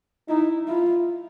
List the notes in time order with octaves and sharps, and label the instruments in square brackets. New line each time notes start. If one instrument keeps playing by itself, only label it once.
[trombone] D#4 [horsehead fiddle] E4
[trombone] E4 [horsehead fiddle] F4